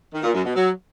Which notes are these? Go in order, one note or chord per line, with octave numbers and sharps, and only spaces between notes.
D#3
A#2
F#2
B2
F#3